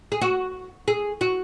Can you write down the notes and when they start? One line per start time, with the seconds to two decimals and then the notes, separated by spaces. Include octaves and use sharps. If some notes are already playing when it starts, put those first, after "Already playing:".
0.12 G#4
0.21 F#4
0.88 G#4
1.21 F#4